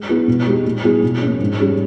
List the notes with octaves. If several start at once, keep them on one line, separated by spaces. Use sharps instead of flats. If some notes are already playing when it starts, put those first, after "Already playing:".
Already playing: G#3
B3 E4 G#4 B4
B2
G#3 D#4 G4
A#2
G3 B3 E4 G#4
B2
A#3 C#4
G#2
G3 C#4 G#4